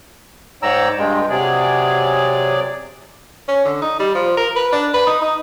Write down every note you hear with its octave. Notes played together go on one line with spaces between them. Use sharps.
G#2 C#5 D5 G5 A#5 E6
G2 G#3 F4 G5
C3 F#3 G#4 D5
C#4
D3
D#4
G3
F3
A#4
B4
D4
B4
D#4
D#4